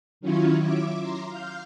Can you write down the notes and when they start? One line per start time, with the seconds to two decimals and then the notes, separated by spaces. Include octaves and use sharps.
0.21 D#3 F#3 C#4 E4 F4 C#5
0.59 E5 D6
0.99 A#5 C6
1.28 F5 F6 G6